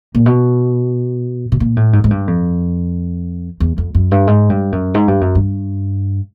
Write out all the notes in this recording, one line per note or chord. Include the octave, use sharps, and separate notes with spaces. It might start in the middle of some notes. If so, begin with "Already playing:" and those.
A#2
B2
B2
A#2
A2
G#2
G#2
G2
F2
E2
F2
F#2
G2
G#2
G2
F#2
G#2
G2
F#2
G2